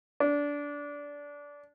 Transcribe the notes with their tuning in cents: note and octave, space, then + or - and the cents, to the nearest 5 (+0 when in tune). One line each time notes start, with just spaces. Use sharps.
D4 -20